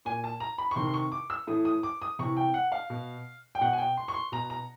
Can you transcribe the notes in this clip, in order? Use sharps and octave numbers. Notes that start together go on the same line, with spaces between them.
A#2 G#5
A5
A#5
B5
C#6
C3 D#3 C6
C6
C#6
D6
E6
A2 E3 D#6
D#6
D6
D#6
C3 E3 C#6
G5
F#5
F5
B2
G5
B2 F#5
G#5
G5
C6
C#6
C6
B2 A#5
A#5